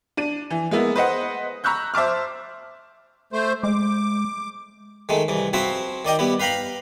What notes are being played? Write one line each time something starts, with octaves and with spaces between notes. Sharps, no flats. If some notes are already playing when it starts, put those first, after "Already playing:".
D4 D#7
E3
G#3 A#3 B3 E4
B4 C5 D#5 F#5
A#5 B5 C#6 E6 F#6 G6
C5 E5 A5 D6 F6
A3 C5
G#3 D6
D#3 G#3 A3
C2 E3
F3 C4 E4 F#4 E5
D#3 D5 D#5 G5
G3 B3 E4
B4 F5 G5 A#5 B5